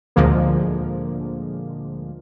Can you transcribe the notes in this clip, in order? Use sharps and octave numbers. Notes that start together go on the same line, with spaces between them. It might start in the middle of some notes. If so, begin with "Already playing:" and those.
D2 A#2 D3 F3 G#3 A#3